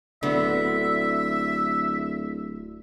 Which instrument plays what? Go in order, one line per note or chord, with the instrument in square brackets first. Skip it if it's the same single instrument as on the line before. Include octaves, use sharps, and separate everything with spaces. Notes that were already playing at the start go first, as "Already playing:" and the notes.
[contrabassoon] D1 [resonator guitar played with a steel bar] D3 B3 [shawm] E5